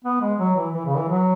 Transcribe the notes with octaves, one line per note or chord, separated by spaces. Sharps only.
B3
G#3
F#3
E3
E3
C#3
E3
F#3